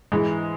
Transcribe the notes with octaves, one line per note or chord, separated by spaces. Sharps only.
G#2 E3 G#3